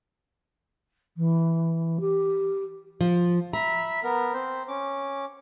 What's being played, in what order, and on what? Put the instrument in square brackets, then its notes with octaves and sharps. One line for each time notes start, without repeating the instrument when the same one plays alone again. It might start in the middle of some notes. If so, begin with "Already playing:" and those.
[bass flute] E3
G4
[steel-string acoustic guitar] F3
[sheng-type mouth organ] E5 B5 [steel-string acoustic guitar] A#5
[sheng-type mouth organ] B3 A#4
C4 C5
C#4 D6